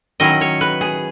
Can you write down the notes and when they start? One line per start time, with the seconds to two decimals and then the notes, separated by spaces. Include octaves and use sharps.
0.20 D#3 F#3 C#4 E4 D#5
0.41 C#5
0.61 B4
0.81 G#4